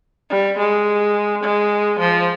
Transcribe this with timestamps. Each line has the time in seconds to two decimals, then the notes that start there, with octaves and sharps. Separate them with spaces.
0.30 G3
0.59 G#3
1.43 G#3
2.00 F3